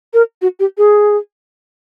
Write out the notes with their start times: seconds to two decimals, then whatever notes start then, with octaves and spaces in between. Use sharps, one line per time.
0.14 A#4
0.42 F#4
0.60 G4
0.78 G#4